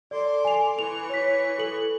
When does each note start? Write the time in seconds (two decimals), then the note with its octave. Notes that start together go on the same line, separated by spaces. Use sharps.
0.11 A4 D5 C6 D6
0.45 G#5 F7
0.79 E3 C#6 F7
1.09 C#5 B6
1.59 A4 F#7